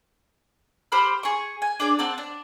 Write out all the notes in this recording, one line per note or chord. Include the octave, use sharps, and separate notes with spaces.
G4 C5 B5 F6
G#4 C#6
G#5
D4 G#4 D5
C4 F#5 A5
D4